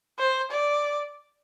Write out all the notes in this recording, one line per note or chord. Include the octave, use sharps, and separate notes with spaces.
C5
D5